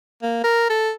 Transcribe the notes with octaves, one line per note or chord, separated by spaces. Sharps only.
A#3
A#4
A4